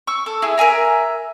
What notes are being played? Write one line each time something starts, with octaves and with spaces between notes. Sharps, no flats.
C#6 E6
A4
E4 G#4
A#4 E5 G#5 A#5